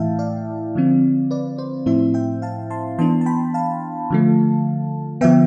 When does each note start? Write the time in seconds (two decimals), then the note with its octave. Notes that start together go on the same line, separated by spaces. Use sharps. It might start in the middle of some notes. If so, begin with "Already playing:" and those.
Already playing: A2 E3 A3 E4 E5 F5 G5 A5
0.19 D5 F5
0.75 D3 F3 C4
1.31 B4 D5
1.58 C5
1.86 A2 F3 C4 E4 C5 E5
2.14 E5 G5
2.42 F5 A5
2.70 A5 C6
2.99 E3 B3 D4 A5 C6
3.21 A5
3.26 G5 B5
3.54 F5 A5
4.10 D3 F3 A3
5.21 D3 F3 B3 E5 G5